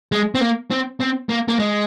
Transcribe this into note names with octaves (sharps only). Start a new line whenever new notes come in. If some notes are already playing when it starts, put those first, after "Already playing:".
G#3
C4
A#3
C4
C4
A#3
A#3
G#3